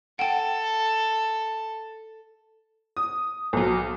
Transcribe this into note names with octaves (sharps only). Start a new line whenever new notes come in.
A4 F#5 G5
D#6
B1 F#3